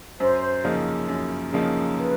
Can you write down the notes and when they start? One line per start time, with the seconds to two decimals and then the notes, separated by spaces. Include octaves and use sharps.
0.20 F#2 C5
0.64 C#3 F3 A#3 D#4
1.09 F#2
1.53 C#3 F3 A#3 D#4
1.98 B4